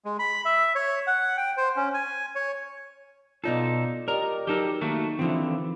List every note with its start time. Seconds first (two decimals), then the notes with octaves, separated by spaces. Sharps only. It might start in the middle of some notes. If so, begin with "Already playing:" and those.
0.05 G#3
0.19 B5
0.45 E5
0.75 C#5
1.07 F#5
1.37 G5
1.57 C5
1.76 C#4
1.94 G#5
2.35 C#5
3.44 B2 D#4 F4 A4 D5 D#5
4.08 G4 A#4 D5 D#5 A#5
4.47 F#3 D#4 G4 A4 A#4
4.81 D#3 A3 A#3 F#4
5.19 D3 E3 F3 C4 E4